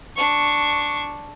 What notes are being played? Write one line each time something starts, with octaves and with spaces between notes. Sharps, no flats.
D4 C#6